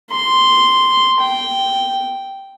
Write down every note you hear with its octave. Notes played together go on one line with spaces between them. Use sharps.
C6
G5